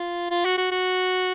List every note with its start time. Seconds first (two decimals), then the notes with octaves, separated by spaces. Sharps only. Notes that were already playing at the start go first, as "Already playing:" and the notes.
Already playing: F4
0.31 F4
0.45 F#4
0.58 F#4
0.72 F#4